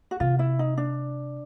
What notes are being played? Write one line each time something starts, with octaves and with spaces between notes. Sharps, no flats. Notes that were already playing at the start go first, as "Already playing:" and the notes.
F#4
C3 F4
E4
D#4
D4